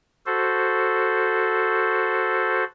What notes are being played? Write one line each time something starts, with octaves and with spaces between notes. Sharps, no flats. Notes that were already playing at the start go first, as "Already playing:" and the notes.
F#4 A4 C5